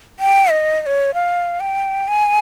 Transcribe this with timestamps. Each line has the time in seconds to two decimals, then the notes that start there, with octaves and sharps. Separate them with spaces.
0.20 G5
0.51 D#5
0.82 D#5
0.86 C#5
1.14 F5
1.60 G5
2.08 G#5